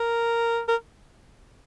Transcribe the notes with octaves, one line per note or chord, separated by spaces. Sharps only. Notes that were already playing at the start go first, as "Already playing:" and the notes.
Already playing: A#4
A#4